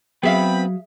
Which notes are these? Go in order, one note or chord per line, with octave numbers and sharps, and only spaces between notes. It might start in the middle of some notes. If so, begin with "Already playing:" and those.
F#3 B3 C4 G#4 E5 F5 G5 B5